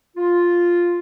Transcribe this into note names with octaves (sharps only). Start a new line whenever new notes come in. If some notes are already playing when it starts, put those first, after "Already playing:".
F4